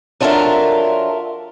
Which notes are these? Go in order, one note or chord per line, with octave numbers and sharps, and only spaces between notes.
F#3 D4 F4 A4 A#4 E5